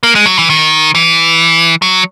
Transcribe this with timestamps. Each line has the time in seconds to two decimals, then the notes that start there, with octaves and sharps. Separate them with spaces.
0.03 A#3
0.15 G#3
0.26 F#3
0.39 E3
0.50 D#3
0.95 E3
1.82 F#3